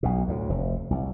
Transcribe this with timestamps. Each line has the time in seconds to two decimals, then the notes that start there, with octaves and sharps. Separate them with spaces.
0.03 B1 B2
0.28 D2 A2
0.49 F1
0.91 C2